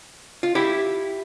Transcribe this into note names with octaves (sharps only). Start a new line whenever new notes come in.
F4
E4 G4